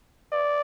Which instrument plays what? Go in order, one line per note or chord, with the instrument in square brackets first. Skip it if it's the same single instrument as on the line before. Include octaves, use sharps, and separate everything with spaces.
[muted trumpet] D5